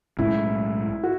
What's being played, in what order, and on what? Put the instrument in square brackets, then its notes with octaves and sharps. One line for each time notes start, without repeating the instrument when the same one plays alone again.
[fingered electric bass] B1 A2 G#3 C#4 [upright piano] E4
[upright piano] F#4